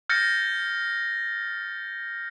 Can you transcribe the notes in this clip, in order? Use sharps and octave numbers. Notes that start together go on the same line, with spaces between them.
F6 G6 A6 A#6 C#7